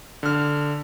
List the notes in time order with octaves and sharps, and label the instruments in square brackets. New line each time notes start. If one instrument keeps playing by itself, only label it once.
[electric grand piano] D3 F6